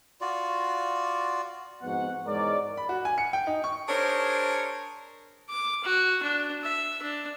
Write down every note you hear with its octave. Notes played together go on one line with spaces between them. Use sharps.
F4 F#4 D5
F2 G#2 B3 F#4 F#5
E2 G#2 G#3 A#4 C#5 D5
B5
F#4
G#5
C#7
G5
D#4
C#6
D4 G#4 A#4 C5 C#5
D6
F#4
D4
E5
D4